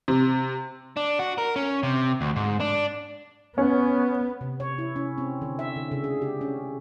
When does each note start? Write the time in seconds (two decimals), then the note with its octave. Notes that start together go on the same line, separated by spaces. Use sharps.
0.08 C3
0.97 D4
1.19 F#4
1.38 A#4
1.56 C#4
1.83 C3
2.21 D2
2.36 G#2
2.60 D4
3.58 B3 C#4
4.41 C3
4.60 C#5
4.78 E4
4.96 C#4
5.18 C4
5.42 D3
5.59 E5
5.76 D3
5.92 C#3
6.04 G#4
6.22 G4
6.41 C#4